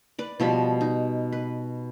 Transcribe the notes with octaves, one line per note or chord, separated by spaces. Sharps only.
B4 D5
B2 F3 G3 B5
D#4
B4